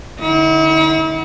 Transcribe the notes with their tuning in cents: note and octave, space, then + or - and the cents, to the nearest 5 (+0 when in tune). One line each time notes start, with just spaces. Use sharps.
D3 +20 E4 -45